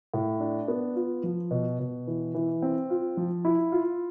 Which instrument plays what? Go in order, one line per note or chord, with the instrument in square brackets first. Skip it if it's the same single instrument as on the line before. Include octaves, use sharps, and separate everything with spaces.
[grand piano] A2
D4
B3
F4
F3
B2
B2
E3
E3
C4
F4
F3
E4
F4